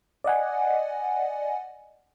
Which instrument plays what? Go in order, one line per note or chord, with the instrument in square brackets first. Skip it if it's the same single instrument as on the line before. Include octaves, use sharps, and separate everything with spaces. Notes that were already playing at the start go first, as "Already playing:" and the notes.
[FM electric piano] D5 D#5 F#5 G#5